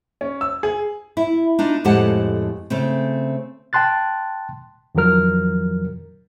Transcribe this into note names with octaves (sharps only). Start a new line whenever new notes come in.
C#4
E6
G#4
E4
D4 D#4 F4
F2 A2 G#3 G4 F#5 A5
C#3 A3 C4
G5 A5 C6 F#6 A6
F2 D#3 F3 F#3 A#4 F6